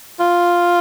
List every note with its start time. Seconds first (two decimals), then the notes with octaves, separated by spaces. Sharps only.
0.20 F4